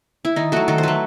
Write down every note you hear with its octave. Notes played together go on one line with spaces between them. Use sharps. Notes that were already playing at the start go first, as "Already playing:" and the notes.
E4
D#3 D#4
F#3 A3 F#4
D#3 A4
C5
F#3 A3 B4